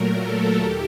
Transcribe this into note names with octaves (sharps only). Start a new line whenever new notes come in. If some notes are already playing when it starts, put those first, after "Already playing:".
Already playing: A#2 F#3 A3 A#4
A4
D#2 G4